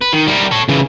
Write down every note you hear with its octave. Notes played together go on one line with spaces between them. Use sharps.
B4
D#3
G3 A#4
A4 C#5
C#3 E3